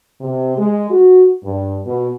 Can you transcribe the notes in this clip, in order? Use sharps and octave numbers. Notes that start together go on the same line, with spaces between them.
C3
G#3
F#4
G2
B2